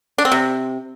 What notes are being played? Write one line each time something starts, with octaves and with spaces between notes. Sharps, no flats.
D4
C4
C3